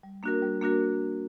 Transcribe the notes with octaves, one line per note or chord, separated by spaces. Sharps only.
G3
A#3 D4 F#4 A#4
G3
A#3 D4 F#4 A#4